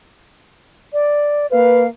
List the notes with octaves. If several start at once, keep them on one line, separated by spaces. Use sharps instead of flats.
D5
A#3 B4 F5